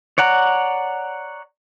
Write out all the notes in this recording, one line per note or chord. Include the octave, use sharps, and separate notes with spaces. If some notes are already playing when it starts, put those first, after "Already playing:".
C#5 D5 F#5 A#5